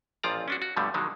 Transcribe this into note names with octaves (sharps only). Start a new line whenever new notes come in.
A1 A#2 F3 F4 D5 A#5
C#4 D4 F#4
F#4
G2 B2 D3 F3 G3 A3
B2 D3 D#3 F#3 G#3